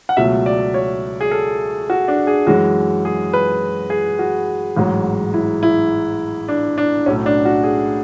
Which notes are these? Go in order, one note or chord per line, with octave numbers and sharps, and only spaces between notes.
F#5
C#2 B2 F#3 A3 E5
D5
C#5
G#4
A4
F#4
D4
G#4
F#2 E3 G#3 F#4
G#4
B4
G#4
F#4
A1 G#2 F#3
E4
E4
D4
D4
B1 A2 F#3 A3 C#4
D4
F#4
G#4